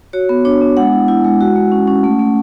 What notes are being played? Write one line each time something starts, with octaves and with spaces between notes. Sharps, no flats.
F#4 C#5
B3
D4 C#5
B3
G#3 F#5
E4
E4
G#3
F#4
G#3
C#4
C#4
A3
A3